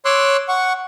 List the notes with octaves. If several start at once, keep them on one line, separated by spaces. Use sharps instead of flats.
C#5 C6 D6 E6 F#6
F#5 C#6